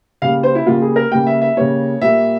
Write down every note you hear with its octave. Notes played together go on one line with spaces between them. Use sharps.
C#3 G3 A#3 F5
C5
E4
C#3 G3 A#3 F4
G#4
A#4
C#3 G3 A#3 G5
E5
E5
C#3 G3 A#3 C#5
A#2 G3 A#3 E5